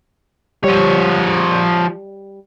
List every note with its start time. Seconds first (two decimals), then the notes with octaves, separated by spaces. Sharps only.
0.64 F3 G3 C#5